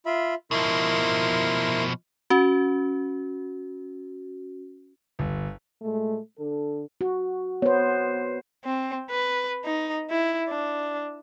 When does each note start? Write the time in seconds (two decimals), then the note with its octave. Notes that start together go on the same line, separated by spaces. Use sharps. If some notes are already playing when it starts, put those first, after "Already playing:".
0.06 F4 E5 B5
0.51 B2 F3 E4 A#4 C6
2.30 C#4 F#4
5.19 G1
5.82 A#2 G#3 A3
6.39 D3 D4 A4
7.01 F#4
7.62 B3 C5 C#5
8.65 C4
9.11 B4
9.65 D#4
10.10 E4
10.49 D4